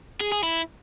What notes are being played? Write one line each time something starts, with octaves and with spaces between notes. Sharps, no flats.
G#4
G#4
E4